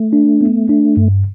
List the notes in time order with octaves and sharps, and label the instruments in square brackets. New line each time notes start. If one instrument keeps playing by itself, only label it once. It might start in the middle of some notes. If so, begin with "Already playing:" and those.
Already playing: [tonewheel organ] A3
[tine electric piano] D4
B3
D4
G2